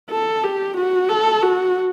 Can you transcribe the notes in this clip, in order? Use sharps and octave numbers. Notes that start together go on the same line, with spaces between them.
A4
G4
F#4
A4
F#4